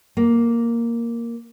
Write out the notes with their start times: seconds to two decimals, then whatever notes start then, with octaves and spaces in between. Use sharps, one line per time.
0.17 A#3